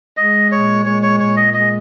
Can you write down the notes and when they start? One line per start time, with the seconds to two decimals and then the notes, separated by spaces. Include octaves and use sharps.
0.17 G#3 D#5
0.52 A#2 C#5
0.86 G#3 C#5
1.03 C#5
1.20 A#2 C#5
1.36 D#5
1.54 G#3 D#5